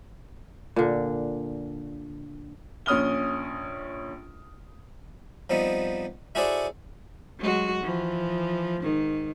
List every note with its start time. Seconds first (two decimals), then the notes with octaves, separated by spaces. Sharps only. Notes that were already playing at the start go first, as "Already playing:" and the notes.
0.76 A#2 D3
2.86 A#1 C#4 D#6 F6 G7
5.50 F3 G3 B3 C4 D#4
6.35 E4 F#4 G#4 A4 C5 D5
7.39 F#3 G#3 F#4
7.83 E3 F3
8.81 G#2 D#3